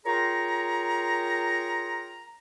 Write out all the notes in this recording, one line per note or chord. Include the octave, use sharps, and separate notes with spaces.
F4 G#4 A#4 C#5 G5 A#5